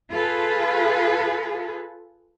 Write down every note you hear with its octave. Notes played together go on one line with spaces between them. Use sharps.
F4 G#4 A4 B4